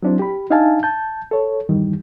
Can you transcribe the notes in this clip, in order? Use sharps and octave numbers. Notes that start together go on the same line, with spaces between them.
F#3 C4 D4 E4 C5
G4 B5
D4 D#4 E5 F5 G#5 A5
A5 G6
A4 C#5
E2 G2 D#3 E3 G3